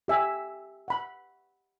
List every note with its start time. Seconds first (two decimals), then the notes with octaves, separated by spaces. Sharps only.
0.08 G4 E5 G#5
0.88 F#5 B5